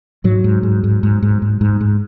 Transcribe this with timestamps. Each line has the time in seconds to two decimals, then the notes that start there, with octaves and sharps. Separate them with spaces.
0.24 G#2 F#3
0.44 G#2
0.63 G#2
0.84 G#2
1.03 G#2
1.22 G#2
1.42 G#2
1.61 G#2
1.81 G#2